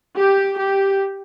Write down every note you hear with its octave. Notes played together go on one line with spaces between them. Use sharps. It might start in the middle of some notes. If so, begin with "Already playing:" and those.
G4
G4